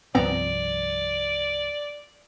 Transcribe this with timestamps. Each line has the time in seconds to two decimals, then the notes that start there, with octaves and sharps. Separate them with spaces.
0.15 C2 G2 F3 B3 C4 D5 A#5